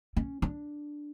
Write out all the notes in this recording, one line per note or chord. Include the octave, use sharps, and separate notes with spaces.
C#4
D4